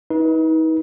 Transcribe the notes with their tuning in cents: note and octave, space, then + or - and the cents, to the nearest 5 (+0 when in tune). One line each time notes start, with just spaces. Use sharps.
D#4 +40 B4 -25